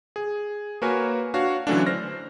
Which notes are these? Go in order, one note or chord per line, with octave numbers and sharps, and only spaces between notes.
G#4
A#3 F#4 A#4 B4 C#5 G#5
D4 F#4 C#5 F5
D3 E3 F#3 A3 C#4 D4
C5 F6 A#6